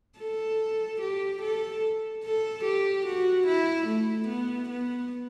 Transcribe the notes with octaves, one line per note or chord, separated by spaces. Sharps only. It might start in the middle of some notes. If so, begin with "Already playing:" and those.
A4
G4
A4
A4
G4
F#4
E4
A3
B3
B3